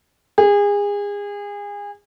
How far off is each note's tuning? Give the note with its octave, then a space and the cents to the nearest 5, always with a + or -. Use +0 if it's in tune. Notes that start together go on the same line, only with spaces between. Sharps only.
G#4 -30